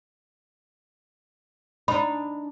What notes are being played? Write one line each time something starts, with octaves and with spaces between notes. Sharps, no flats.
D4 D#4 B5